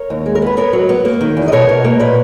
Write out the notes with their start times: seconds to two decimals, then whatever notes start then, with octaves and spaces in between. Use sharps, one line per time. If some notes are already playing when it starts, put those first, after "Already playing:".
Already playing: A#4 C#5
0.10 D#2
0.26 G#3
0.35 A#4
0.42 B3 B4
0.57 B3 A#4 C#5
0.73 F#3
0.89 B3
1.05 A#3
1.21 D#3
1.37 E2
1.48 D#5
1.52 B2 A#4 C#5
1.69 B2
1.84 A#3
2.00 A#2 B4 D#5